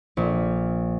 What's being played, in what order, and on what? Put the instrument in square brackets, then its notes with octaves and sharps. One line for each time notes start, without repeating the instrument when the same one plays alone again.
[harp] A#1